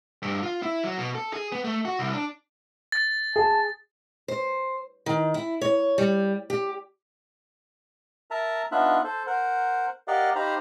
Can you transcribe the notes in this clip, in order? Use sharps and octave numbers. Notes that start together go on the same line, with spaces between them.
G2
F4
E4
F#3
B2
A4
G#4
B3
A3
F#4
C2
D4
A6
G#4 A5
C5
D#3
E4
C#5
G3
G4
A#4 E5 A5 A#5
B3 D4 D#4 F4 E5 F#6
A4 C5
A#4 C5 F#5
G4 A#4 D5 D#5 F5 F#5
D#4 G4 C5 F5 A#5 B5